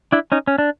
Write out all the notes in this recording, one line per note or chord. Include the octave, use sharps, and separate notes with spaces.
D4 E4
C#4 D#4
C#4
D4